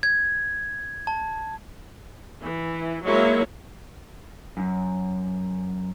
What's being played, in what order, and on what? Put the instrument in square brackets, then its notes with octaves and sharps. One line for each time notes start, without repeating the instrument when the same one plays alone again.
[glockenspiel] G#6
A5
[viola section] E3
F#3 G#3 A#3 E4 C#5
[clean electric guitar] F#2